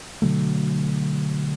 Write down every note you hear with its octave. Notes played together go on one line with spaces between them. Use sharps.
B2 D3 F#3 A3